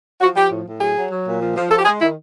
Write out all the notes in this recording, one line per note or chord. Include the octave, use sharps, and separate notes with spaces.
F3 F#4
F3 G4
A2
A2
F#3 G#4
F#3
F#3
A#2
F3
F3
F3 A4
G4
G#3 G#4
D#3 E4